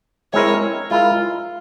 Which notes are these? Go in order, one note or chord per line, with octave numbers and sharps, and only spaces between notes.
G#3 C4 E4 A#4 C#5
G#3 E4 F4 A#4